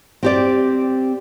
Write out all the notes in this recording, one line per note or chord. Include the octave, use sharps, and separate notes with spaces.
C4 G4 D5